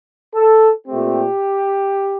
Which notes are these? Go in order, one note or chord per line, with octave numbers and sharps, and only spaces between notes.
A4
A#2 A3 C4 G4